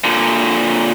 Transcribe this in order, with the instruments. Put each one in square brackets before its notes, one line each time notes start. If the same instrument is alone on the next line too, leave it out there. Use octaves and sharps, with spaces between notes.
[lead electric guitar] A#2 D3